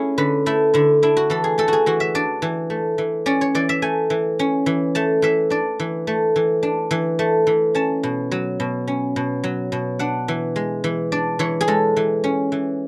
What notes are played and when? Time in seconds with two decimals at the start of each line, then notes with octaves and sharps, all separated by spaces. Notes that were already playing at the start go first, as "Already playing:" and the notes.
Already playing: A3 C#4 E4 G#4
0.18 D3 B4
0.46 A3 E4
0.74 D3 E4
1.03 D4 E4
1.17 F#4
1.30 E3 A4
1.44 G#4
1.58 A3 A4
1.68 F#4 G#4
1.86 E3 F#4
2.00 E5
2.15 D4 D5
2.42 E3
2.70 A3
2.98 E3
3.26 C#4 D5
3.41 C#5
3.55 E3 D5
3.69 E5
3.82 A3 G#5
4.10 E3
4.39 C#4
4.66 E3
4.95 A3 A5
5.22 E3 E5
5.50 D4 D5
5.80 E3
6.07 A3
6.36 E3
6.63 D4
6.91 E3
7.19 A3
7.47 E3
7.75 C#4 A5
8.03 B2
8.31 F#3
8.60 B2
8.88 C#4
9.16 B2
9.44 F#3
9.72 B2
9.99 D4 F#5
10.28 E3
10.56 G#3
10.84 E3
11.12 D4 D5
11.39 E3 C#5
11.61 G#4
11.68 G#3 A4
11.96 E3
12.24 C#4
12.52 E3